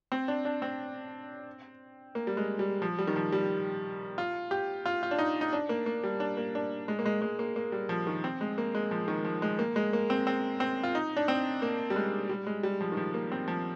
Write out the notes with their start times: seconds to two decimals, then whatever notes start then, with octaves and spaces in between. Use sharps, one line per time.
0.12 C4
0.28 D4
0.45 D4
0.62 C4
2.15 A#3
2.27 G3
2.37 G#3
2.59 G3
2.82 F3
2.99 G3
3.07 D#3
3.16 F3
3.32 G3
4.18 F4
4.51 G4
4.86 F4
5.03 F4
5.11 D4
5.18 D#4
5.41 D#4
5.53 D4
5.69 A#3
5.86 A#3
6.04 G3
6.20 D4
6.37 A#3
6.55 D4
6.88 G#3
6.99 A#3
7.06 G#3
7.22 G#3
7.39 A#3
7.56 A#3
7.72 G3
7.89 F3
8.07 D#3
8.24 C4
8.41 G#3
8.58 A#3
8.75 G#3
8.91 F3
9.08 D#3
9.24 F3
9.42 G#3
9.59 A#3
9.76 G#3
9.93 A#3
10.10 C4
10.27 C4
10.60 C4
10.83 F4
10.95 D#4
11.16 D4
11.28 C4
11.62 A#3
11.90 G3
11.96 G#3
12.29 G3
12.47 G#3
12.63 G3
12.81 F3
12.92 D#3
12.97 F3
13.14 A#3
13.32 C4
13.48 F3